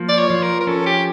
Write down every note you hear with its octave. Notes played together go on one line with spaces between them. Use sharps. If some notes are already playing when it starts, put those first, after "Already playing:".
Already playing: F3 A#3
D5
C#5
F3
A#4
A#4
C#4 A4
G4